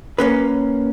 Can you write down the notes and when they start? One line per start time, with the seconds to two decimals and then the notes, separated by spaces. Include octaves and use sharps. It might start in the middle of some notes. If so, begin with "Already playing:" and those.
0.18 A#3 C#4 B4